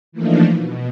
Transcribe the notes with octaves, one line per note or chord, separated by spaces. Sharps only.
E3 F3 A3 A#3 D4 D#4
B2